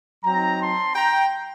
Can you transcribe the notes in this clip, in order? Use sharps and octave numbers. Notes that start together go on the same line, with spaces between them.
F#3 C4 D#4 G5 A#5
A5 C6
G5 A#5